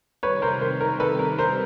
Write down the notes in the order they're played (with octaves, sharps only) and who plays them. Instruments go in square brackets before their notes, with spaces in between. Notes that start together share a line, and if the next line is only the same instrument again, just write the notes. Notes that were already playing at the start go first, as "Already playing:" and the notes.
[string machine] C3 D#3 G3 [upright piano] B4 C#5
[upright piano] A#4 C5
A#4 C5
A#4
A4 B4
A#4
A#4 C5